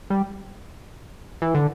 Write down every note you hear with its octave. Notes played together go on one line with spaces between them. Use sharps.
G3
E3
D3